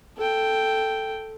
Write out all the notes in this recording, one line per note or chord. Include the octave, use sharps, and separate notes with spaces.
A4 G5